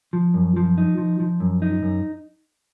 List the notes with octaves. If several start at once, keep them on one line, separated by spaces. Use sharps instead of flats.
F3
F#2
F3
D#4
F3
F3
F#2
D#4
F#2